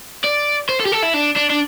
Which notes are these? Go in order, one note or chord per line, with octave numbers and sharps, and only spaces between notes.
D5
C5
A4
G4
A4
E4
D4
D4
D4